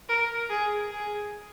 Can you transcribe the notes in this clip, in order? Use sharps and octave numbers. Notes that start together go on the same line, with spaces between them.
A#4
G#4
G#4